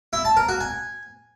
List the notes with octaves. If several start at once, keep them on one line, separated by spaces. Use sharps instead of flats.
E4
A5
A#4
F#4
G#5